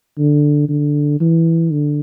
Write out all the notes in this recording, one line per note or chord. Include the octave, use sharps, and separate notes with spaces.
D3
D3
E3
D3